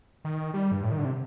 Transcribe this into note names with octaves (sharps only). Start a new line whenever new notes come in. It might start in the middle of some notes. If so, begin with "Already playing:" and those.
D#3
G3
G2
A2
D#3
D3
C3